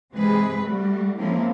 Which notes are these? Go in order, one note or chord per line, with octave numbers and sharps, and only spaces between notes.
C3 E3 G#3 C4 G#4 B4
G3 A3 F#4
F3 G#3 A#3 C4 C#4 E4